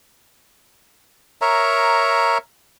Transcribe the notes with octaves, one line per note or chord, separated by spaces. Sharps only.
A#4 C#5 E5 A#5